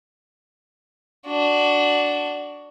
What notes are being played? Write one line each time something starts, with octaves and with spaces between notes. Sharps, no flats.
D4 F#4